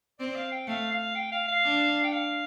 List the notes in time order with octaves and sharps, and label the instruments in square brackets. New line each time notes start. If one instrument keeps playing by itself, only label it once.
[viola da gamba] C4 [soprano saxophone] D5
[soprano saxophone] F5
G5
[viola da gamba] A3 [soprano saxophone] F5
[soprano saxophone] F5
G5
F5
F5
[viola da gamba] D4
[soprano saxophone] G5
F5